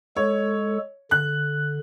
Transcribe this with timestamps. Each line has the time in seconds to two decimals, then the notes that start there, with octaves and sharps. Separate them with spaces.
0.16 G#3 A4 C#5
1.11 D3 F#6